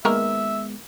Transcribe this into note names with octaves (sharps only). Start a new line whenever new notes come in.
D#3 G#3 A#3 B3 A#4 E5